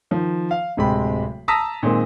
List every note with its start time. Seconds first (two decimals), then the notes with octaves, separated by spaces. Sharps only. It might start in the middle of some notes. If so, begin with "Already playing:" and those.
0.11 D#3 F3
0.51 F5
0.77 D1 C3 G#3 G5 B5
1.48 A5 A#5 D#6 E6 A#6 B6
1.83 A#2 D#3 G#3 C4 G#4